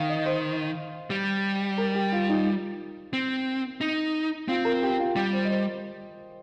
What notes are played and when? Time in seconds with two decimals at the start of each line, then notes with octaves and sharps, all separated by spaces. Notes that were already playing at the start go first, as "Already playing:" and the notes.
Already playing: D#3 F5
0.09 D#5
0.26 C5
1.10 G3
1.78 A#4
1.95 G4
2.12 F4
2.29 D#4
3.13 C4
3.81 D#4
4.48 C4 F4
4.65 A#4
4.83 G4
4.99 F4
5.16 G3 G4
5.33 C5
5.45 D#5
5.50 C5